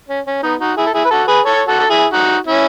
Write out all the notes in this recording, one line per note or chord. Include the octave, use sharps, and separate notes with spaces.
C#4
C#4
B3 D#4
D#4 F#4
E4 G#4
A4
E4 G#4
B4
F#4 A4
G#4 B4
A4 C#5
F#4 A4
A4
E4 G#4
D#4 F#4
C#4 E4